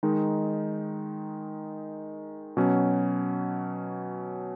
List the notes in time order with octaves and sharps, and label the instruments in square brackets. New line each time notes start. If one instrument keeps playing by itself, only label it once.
[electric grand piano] D#3 G#3 D#4
B2 F#3 C#4